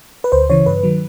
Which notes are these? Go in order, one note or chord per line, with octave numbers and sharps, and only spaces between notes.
B4
D2 C5
C#3 E3 C#5
G2 B4
D#3 F#3